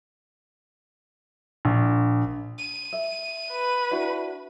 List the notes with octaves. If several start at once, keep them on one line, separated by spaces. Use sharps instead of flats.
A#1
D#7
E5
B4
D4 E4 F#4